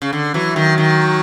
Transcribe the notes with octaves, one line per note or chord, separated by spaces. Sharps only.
C#3
D3
E3 F#3
D#3 F#3
D#3